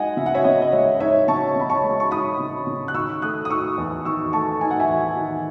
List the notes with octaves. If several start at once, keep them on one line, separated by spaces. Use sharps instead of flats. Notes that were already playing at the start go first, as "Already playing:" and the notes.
Already playing: G#3 D#4 D#5 F#5 G#5
C#3 E5
F#5
C#5 E5
C#3 D#5
D#5
G#3 C#5 E5
D#4 C#5 E5
C#3 A5 C#6
C#3 B5
A5 C#6
G#3
C#6
D#4 B5 D#6
C#3
C#3
F#6
D#3 C#6 E6
A3 D#6 F#6
D#6
D#4 C#6 E6
E2
D#3 C#6 E6
A3 A5 C#6
D#4 G#5
F#5
E5 G#5
E2
D#3